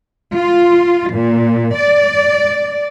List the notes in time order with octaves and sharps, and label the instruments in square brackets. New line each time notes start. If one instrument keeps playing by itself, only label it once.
[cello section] F4
A#2
D5